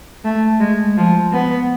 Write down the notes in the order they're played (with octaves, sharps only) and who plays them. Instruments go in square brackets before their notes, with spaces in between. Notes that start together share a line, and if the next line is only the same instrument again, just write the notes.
[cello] A3
G#3
F3
B3